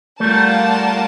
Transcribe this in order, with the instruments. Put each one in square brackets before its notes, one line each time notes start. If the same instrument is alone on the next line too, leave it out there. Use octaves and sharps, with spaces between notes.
[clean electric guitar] G3 A3 [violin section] F4 A#4 D5 F#5 A5